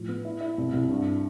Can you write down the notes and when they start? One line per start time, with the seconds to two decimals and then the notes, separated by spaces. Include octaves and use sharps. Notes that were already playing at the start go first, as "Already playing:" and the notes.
Already playing: A2 F3
0.09 B3
0.25 E4
0.41 E4
0.58 C2
0.73 C2
0.89 G2